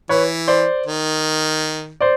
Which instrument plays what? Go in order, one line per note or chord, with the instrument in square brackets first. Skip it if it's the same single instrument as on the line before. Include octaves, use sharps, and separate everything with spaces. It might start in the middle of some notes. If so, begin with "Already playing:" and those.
[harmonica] E3 [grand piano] B4 C#5
[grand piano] C5 D5
[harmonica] D#3
[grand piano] C5 D5